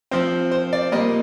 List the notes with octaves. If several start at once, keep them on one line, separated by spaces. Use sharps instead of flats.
F3 C4 C5
C5
D5
A#2 G3 A#3 D#5